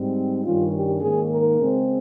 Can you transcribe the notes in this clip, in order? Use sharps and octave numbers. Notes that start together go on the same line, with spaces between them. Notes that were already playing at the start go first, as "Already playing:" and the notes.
Already playing: G#2 G3 C4
G2 D#3 G3 C#4 F4
G4
G#2 D#3 A#3 C#4 G#4
A#4
C#3 G#3 C4